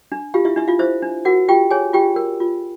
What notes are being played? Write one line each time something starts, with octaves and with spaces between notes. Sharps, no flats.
D4
F4 G4 F5
E4 E5
D4 E4 E5
F4 F5
E4 C5 E5
D4
F#4 A#4 F#5
F4 G4 G5
G#4 C#5 G#5
F4 G4 G5
A#4
F4